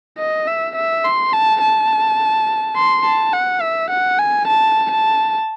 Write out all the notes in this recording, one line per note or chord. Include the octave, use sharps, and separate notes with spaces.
D#5
E5
E5
C6
A5
A5
C6
A5
F#5
E5
F#5
G#5
A5
A5